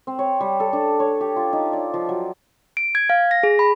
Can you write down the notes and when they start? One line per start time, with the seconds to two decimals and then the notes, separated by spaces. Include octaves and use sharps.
0.07 C4
0.19 C#5
0.40 G3
0.60 A4
0.73 D4
1.00 C#5
1.21 G4
1.36 F4
1.53 D#4
1.73 D5
1.94 F3
2.09 F#3
2.77 D7
2.95 G#6
3.10 F5
3.31 A#6
3.43 G#4
3.59 B5